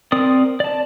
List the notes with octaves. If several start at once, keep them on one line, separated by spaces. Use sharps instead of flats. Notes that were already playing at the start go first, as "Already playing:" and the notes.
C4 A#4 D5 D#6
D5 A5